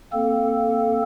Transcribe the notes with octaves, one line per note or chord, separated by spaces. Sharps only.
A#3 C4 A4